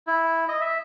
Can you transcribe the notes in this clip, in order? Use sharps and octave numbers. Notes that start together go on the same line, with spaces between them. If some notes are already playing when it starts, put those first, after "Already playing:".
E4
D#5
E5